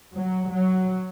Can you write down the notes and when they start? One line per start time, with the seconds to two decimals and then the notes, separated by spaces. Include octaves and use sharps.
0.14 F#3
0.50 F#3